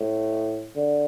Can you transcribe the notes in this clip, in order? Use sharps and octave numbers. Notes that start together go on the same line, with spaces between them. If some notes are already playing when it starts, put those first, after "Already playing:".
Already playing: A2
D3